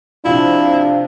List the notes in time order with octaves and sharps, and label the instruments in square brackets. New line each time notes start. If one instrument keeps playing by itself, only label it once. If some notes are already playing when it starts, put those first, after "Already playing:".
[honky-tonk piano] C3 F3 [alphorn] D4 [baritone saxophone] E4 [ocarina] F5